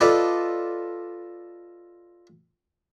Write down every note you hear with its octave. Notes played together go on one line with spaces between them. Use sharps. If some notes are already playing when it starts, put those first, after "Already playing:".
F4 A4 B4 D5 D#5